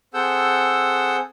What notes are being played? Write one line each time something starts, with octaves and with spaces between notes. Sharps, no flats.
C4 G#4 A4 F#5 E6 G6